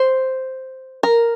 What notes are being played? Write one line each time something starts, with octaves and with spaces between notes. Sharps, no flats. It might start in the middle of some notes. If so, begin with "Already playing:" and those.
Already playing: C5
A#4